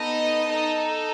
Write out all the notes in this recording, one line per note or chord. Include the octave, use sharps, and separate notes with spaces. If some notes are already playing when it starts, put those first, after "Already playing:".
Already playing: B3 D#4 A4 D#5
D#4 A4